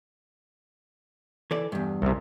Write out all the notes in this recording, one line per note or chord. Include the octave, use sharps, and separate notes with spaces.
E3 A4 D5
E2 G2
C2 C3